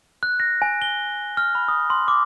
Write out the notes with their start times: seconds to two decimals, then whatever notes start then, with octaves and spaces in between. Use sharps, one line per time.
0.23 F#6
0.40 A#6
0.62 G#5
0.82 G7
1.37 F6
1.55 B5
1.68 D#6
1.90 C6
2.08 D6